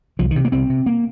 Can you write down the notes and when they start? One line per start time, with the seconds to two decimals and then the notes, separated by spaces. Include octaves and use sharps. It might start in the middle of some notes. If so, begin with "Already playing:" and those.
0.19 C2 F3
0.31 D#3
0.36 C3
0.45 A#3
0.52 C2 C4
0.70 C3
0.86 A#3